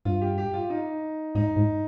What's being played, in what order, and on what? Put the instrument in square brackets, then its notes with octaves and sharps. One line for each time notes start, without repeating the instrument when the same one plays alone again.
[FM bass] G2 [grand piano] F4
[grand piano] G4
G4
F4
D#4
[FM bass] G#2 [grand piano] D#4
[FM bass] G#2